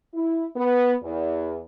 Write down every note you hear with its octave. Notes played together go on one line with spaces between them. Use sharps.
E4
B3
E2